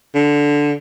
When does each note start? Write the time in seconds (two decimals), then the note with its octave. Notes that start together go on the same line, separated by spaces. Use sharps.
0.15 D3